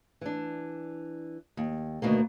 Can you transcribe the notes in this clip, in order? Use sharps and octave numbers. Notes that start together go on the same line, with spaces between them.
E3 D4
D#2
D2 B2 D#3 A#3